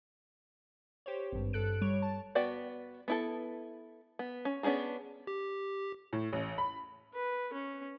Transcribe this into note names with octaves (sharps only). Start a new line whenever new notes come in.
G4 C5 C#5
G#1 G2
G2 A4 F#6 D7
G3 C#5 D7
A5
B3 F#4 D5 G5
B3 E4 A4
B3
C#4
B3 C#4 D4 G#4 A#4
G4
A2
A1
B5
B4
C#4